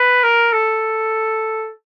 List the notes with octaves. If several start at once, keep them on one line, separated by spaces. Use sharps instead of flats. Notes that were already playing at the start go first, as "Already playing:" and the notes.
Already playing: B4
A#4
A4